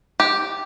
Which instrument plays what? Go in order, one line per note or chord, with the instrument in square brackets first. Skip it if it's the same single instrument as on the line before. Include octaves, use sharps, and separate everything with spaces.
[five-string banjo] G4